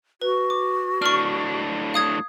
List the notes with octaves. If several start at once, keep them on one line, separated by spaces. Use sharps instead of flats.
F#4 B4
D6
A2 D4 C#6 F6
F5 D#6 G#6